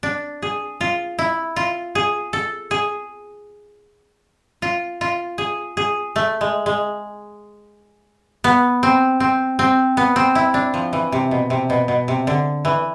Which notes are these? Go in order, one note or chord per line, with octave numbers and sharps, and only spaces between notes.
D4
G#4
F4
E4
F4
G#4
A4
G#4
F4
F4
G#4
G#4
A3
G#3
G#3
B3
C4
C4
C4
B3
C4
E4
D4
F3
E3
C3
B2
C3
B2
B2
C3
D3
E3